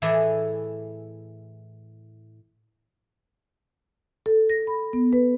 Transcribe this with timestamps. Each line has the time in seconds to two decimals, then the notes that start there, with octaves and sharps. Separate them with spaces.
0.02 A2 E3 E4 G#4 C#5 D5
4.26 A4
4.50 A#6
4.67 B5
4.93 B3
5.13 B4